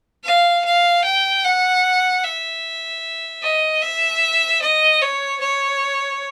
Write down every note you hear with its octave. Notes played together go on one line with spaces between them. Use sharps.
F5
F5
G5
F#5
E5
D#5
E5
D#5
C#5
C#5